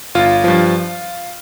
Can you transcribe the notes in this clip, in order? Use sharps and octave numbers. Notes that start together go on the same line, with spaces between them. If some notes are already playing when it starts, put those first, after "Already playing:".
G1 F4
G2 F3